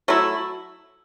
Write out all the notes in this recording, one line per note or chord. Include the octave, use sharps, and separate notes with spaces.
F#3 A3 E4